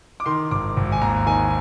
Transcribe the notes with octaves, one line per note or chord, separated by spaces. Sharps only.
D6
D#3 C6
G#1 D6
G#1
G#5
D#2 A#5
D#3 G#5